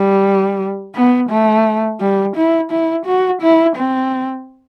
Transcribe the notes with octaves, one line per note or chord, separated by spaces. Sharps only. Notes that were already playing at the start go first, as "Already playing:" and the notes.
Already playing: G3
B3
A3
G3
E4
E4
F#4
E4
C4